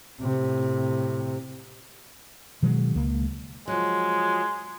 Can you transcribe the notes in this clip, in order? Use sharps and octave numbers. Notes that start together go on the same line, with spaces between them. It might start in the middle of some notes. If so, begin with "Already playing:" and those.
A2 C3
B2 D#3 F#3 G#3
C#2 A#3
F3 F#3 G#3